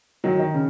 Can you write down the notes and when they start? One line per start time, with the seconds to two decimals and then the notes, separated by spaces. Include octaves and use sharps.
0.24 D#3 F#3
0.39 D#3
0.54 C#3